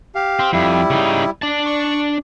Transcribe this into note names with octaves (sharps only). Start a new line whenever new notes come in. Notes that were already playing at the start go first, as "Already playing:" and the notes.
G4 F5
C4
F2 G3 E4
C#3 D#4
D4 A5
C#6